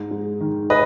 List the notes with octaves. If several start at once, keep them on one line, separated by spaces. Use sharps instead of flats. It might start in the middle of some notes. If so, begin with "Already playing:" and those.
Already playing: G#2
G#3
D#3
B4 D#5